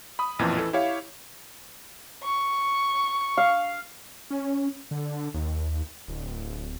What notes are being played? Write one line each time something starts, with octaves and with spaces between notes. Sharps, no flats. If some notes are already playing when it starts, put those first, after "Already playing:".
B5 D#6
A1 F2 A#2 E3
E3 A4
E4 G4 C#5 F5
C#6
F5
C#4
D3
D#2
D1